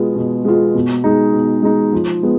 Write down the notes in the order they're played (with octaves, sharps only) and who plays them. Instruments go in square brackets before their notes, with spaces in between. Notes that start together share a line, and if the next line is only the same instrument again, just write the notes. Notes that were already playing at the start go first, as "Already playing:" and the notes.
Already playing: [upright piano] B2 G#3 B3 F4
B2
G#3 B3 F4
B2
G#3 D#4
B2
G#3 D#4
F3
G#3 B3